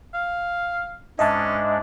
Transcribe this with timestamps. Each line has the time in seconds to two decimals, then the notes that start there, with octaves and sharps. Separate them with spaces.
0.14 F5
1.19 G#2 G#3 C#4 D4 D#5 E5 A5